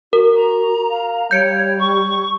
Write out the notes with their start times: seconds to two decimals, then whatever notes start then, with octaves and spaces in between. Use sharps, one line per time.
0.13 F#4 A#4
0.36 A#5
0.90 F5
1.31 G3 C#5 G6 C#7 D7
1.80 C#6